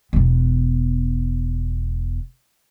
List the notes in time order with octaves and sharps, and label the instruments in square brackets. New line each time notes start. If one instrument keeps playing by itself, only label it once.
[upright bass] E1 B3